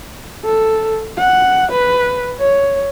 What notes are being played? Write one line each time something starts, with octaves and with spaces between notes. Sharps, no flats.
A4
F#5
B4
C#5